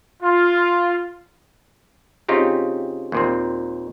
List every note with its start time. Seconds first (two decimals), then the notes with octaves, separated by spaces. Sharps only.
0.22 F4
2.29 C#3 C4 D#4 F4 G4
3.12 D#2 A#2 C4